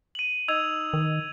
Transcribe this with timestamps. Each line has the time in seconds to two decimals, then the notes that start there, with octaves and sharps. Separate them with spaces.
0.15 D#7 F#7
0.48 D#4 E6 G#6 F7
0.94 D#3